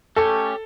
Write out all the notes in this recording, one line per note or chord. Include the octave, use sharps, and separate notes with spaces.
A3 C#4 G4 A4 C#5